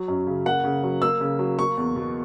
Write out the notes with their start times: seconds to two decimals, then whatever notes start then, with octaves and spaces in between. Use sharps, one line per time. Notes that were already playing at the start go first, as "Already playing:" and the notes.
Already playing: F#3
0.08 F#2
0.27 C#3
0.46 A#3 F#5
0.64 C#3
0.83 F#3
1.02 A#3 E6
1.21 C#3
1.39 F#3
1.59 A#3 C#6
1.77 E2
1.96 B2